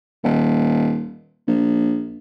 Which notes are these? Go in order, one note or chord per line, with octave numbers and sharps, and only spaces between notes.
D#1
A#1